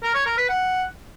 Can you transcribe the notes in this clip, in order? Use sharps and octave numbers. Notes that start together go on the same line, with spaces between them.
A#4
C#5
A#4
B4
F#5